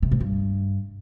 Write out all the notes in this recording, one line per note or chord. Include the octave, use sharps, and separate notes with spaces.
C3
G#2
G2